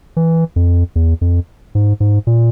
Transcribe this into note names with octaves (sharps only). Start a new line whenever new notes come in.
E3
F2
E2
F2
G#2
G#2
A#2